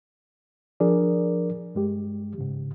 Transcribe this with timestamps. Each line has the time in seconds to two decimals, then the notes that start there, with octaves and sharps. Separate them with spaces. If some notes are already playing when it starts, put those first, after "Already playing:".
0.80 F3 D4 G#4 A#4 D5
1.75 G2 G#3 G4
2.38 G#2 C#3